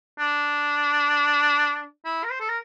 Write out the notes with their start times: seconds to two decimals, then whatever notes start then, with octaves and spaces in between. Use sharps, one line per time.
0.19 D4
2.05 E4
2.24 A#4
2.31 C5
2.40 A4
2.49 A#4